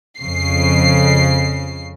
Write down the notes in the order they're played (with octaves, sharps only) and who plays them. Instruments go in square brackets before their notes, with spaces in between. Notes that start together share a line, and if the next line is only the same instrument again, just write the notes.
[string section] F2 C#3 C7